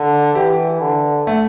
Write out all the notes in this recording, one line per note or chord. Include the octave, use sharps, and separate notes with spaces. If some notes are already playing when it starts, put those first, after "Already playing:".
Already playing: D3
E3 G4
D3
A3